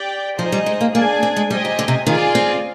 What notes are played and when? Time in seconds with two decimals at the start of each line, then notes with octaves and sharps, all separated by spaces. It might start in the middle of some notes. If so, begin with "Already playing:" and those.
Already playing: G4 D5 G5
0.38 F3 D#4 G#4 C5 D#5
0.52 G3
0.66 G#3
0.81 A#3
0.94 A#3 D4 G#4 D5 G#5
1.23 C4
1.36 G#3
1.50 G3 G4 C5 D#5 G#5
1.65 D#3
1.79 D3
1.88 C3
2.07 D#3 F4 G#4 D5 F5 G#5
2.35 C4